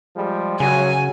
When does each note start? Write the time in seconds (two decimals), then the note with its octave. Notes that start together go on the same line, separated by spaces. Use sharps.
0.16 F3 G3 G#3
0.60 F#2 C#3 F#3 G#5